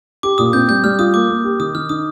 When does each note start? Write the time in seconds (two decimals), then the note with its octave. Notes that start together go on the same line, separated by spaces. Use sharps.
0.23 G4 D6
0.38 A#2 D#6
0.53 C4 G6
0.69 G3 G6
0.84 G3 F6
0.99 F4 D#6
1.14 A#3 D6
1.29 A#3
1.44 G4
1.60 D#3 D#6
1.75 D#3 F6
1.89 D#4 D#6